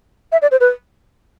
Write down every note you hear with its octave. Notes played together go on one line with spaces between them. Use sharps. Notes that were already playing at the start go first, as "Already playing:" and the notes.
E5
D5
C5
B4